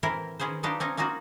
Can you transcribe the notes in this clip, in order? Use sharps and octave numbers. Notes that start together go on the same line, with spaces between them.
A2 E3 C4 E4 A#4 C5
D#3 C#4 G#4 B4 C5
F#3 B3 D4 D#4 F4 G4
C4 C#4 D#4
A#3 C#4 D#4 F4 F#4